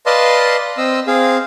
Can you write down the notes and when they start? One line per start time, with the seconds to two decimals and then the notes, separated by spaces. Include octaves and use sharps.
0.06 B4 D5 D#5 F5 A5 C6
0.78 C4 D#5 E6
1.07 C4 G#4 F5